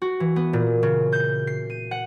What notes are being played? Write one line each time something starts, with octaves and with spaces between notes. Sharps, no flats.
F#4
E3
B3
A#2
C#3
G6
C7
D#7
F#5